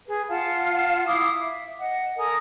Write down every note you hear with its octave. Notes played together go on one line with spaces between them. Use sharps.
G#4 B4
F4 F5 F#5 A5
E4 F5 D6 D#6
E5
D#5 F#5
A4 A#4 G#5 D#6